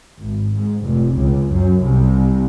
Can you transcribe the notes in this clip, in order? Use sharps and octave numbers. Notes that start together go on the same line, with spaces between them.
G#1
G#2
F1
C#2
F#2
C2